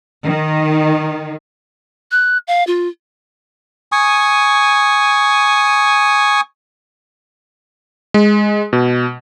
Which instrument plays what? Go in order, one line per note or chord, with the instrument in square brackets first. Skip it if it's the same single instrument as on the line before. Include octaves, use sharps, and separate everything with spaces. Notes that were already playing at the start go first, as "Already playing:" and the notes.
[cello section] D#3
[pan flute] F#6
F5
F4
[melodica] G#5 C#6 D#6
[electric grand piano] G#3
B2